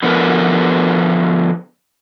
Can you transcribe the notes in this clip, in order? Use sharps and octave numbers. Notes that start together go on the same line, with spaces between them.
D3 F3 B3 A#4 B4